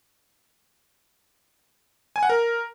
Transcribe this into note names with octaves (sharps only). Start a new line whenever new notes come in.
G#5
F#5
A#4